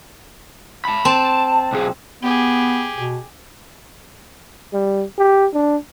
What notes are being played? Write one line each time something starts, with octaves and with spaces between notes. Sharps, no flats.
A5 B5
C4 A5
B1 G#4
B3 G4 G#4
B2
G3
G4
D4